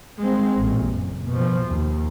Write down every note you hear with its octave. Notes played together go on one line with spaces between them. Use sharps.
G#3 C4
A1 A#2
F#1
B2 F3
D#2